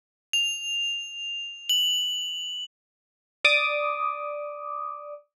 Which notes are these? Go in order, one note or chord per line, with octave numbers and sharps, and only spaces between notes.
F7
F#7
D5 D6 D#6